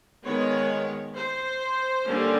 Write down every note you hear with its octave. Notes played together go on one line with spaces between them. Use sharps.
D#3 G#3 B3 C#5
C5
D3 G3 A#3 C#4